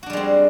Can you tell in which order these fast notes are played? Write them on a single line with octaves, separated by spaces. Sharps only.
F#4 D4 G3 G#3 C4